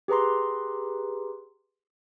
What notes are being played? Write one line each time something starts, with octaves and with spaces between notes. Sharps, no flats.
G4 G#4 B4 A#5 C6